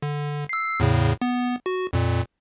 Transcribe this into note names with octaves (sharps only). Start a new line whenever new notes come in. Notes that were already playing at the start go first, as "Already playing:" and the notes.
D3
E6 C7
E2 A2 C#3
B3
F#4
F2 A#2